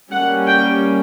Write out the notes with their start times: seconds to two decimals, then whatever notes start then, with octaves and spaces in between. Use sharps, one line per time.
0.11 G3 A#3 C#4 F#5
0.47 G5